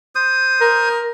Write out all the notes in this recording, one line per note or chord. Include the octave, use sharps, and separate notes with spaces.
C5 D#6
A#4